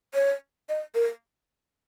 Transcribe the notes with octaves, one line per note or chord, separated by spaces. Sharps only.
C#5
D#5
A#4